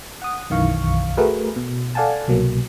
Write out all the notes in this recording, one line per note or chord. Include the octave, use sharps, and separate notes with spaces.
F#5 D#6
B1 F#2 D#3 E3 F5 C#6
A3 F#4 G#4 A#4 B4
B2
A4 D5 F5 F#5 G#5 A5
C2 B2 F#3 A#3